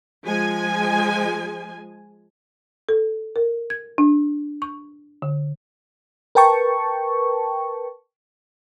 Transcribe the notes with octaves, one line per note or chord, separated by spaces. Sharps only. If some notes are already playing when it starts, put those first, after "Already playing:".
F3 G#3 G#5
A4
A#4
G#6
D4
C#6
D3
A#4 B4 G5 A5 C#6